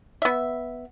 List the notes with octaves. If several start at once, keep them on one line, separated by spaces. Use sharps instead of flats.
B3 E5